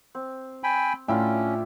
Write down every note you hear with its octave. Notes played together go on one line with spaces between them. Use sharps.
C4
G5 G#5 B5
A2 C#4 D4 E4 F4 E5 G5